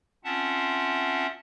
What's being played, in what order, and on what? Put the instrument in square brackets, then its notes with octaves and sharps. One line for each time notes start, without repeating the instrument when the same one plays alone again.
[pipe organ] C4 C#4 F4 E5 F#5 A5